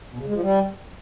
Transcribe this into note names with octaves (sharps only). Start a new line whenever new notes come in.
B2
C#3
G#3
F3
G3